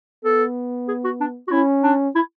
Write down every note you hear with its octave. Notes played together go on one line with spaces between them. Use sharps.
B3 A4
G#4
F#4
D4
F#4
C#4 E4
D4
E4